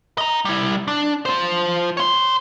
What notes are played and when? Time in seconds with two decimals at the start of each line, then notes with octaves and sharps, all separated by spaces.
0.18 D#5 A#5
0.45 G3 E4
0.88 D4
1.26 F4 C5
1.97 C#5 C6